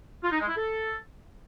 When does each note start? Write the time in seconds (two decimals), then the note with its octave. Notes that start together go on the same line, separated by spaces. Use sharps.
0.23 F4
0.32 D#4
0.40 G#3
0.48 E4
0.57 A4